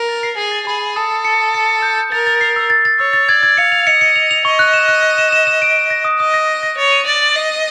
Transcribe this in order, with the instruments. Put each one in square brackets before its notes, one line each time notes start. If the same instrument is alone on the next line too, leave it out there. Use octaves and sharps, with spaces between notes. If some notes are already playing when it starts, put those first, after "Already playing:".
Already playing: [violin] A#4
[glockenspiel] A6
C7
[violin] G#4 [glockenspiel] C7
[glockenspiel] A6
[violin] G#4 [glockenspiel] B5
[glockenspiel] B5
[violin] A4 [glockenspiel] D#6
[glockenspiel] C#7
C#7
D#6
C#7
C#7
G6
G6
[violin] A#4 [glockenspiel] A6
[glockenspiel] A6
C7
E6
A6
A6
[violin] C#5 [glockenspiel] E6
[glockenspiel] A6
[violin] D5 [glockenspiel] G#6
[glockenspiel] G#6
[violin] F5 [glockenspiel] C#7
[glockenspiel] F7
[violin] D#5 [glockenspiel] C#7
[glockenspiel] C#7
F7
F7
[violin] D#5 [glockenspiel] C#6
[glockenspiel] F#6
E7
F#6
F#6
E7
E7
E7
D7
D7
A#6
D#6
[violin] D#5 [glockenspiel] D#6
[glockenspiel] A#6
D#6
A#6
[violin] C#5 [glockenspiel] A6
[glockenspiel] D#7
[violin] D5 [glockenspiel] A6
[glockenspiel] A6
[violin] D#5 [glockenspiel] C7
[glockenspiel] D#7